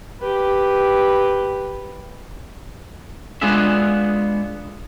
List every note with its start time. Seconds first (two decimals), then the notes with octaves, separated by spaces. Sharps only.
0.20 G4 B4
3.41 G#3 B3 D4 F4 G#4 E5